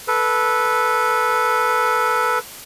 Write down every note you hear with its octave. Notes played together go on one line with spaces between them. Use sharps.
A4 B4